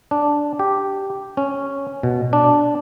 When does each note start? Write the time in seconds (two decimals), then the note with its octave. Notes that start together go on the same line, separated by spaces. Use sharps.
0.11 D4
0.59 G4
1.37 C#4
2.03 B2
2.33 D4